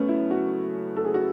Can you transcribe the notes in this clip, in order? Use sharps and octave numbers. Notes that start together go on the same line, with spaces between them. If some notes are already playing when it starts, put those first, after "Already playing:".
Already playing: F#2 C#3 A3 B3 C#4
E4
F#4
A4
G#4
F#4